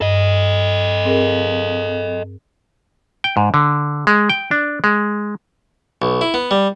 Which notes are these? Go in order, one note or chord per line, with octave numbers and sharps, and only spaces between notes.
G2 A4 D#5
C4 G#4 A#4
G5
G#2
D3
G#3
G5
D4
G#3
B1
E4
B3
G3